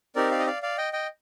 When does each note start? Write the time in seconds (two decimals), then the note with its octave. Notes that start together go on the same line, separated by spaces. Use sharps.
0.15 C4 D#4 G4 A#4 D5
0.31 D5 F5
0.39 D#5
0.47 D5 F5
0.62 D5 F5
0.78 D#5 G5
0.93 D#5 G5